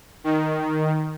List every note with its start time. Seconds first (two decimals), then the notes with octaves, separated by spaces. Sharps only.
0.24 D#3